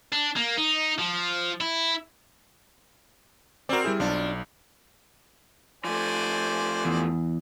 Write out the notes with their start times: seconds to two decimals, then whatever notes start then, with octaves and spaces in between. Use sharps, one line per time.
0.13 D4
0.36 A#3
0.57 D#4
0.99 F3
1.61 E4
3.69 C4 F#4 A#4 D5
3.84 G3 E4 G#4
4.00 B1 D4 F4
5.84 F3 A3 C5 D5 G#5
6.85 E2